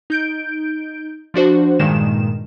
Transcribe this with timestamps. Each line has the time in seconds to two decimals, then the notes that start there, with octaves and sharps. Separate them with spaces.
0.10 D#4 G6 D7
1.34 F3 D4 F#4 C5
1.79 G2 A#2 D#3 G#3 E7